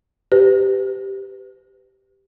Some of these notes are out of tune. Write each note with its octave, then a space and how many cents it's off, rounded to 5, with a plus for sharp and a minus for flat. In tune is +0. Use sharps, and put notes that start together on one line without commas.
G4 +0 B4 +25